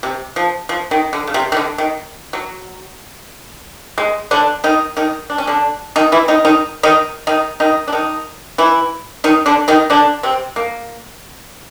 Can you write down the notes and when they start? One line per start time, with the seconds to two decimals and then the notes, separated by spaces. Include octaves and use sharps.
0.03 C3
0.36 F3
0.69 F3
0.91 D#3
1.13 D3
1.27 C#3
1.34 C3
1.52 D#3
1.57 D3
1.78 D#3
2.33 F#3
3.98 G#3
4.31 D3 D4
4.64 D#3 D#4
4.97 D#3 D#4
5.30 D4
5.38 C#4
5.47 D3 D4
5.96 D#3 D#4
6.12 E3 E4
6.28 D#3 D#4
6.45 D#3 D#4
6.83 D#3 D#4
7.27 D#3 D#4
7.60 D#3 D#4
7.88 D4
7.92 D#3 D#4
8.58 E3 E4
9.24 D#3 D#4
9.46 D3 D4
9.68 D#3 D#4
9.90 D3 D4
10.23 C3 C4
10.56 A#3